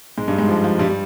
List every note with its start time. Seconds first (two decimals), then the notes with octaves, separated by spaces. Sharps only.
0.18 G#2 G#3
0.28 G2 G3
0.38 G#2 G#3
0.48 F3
0.64 F3
0.79 G2 G3
0.90 G3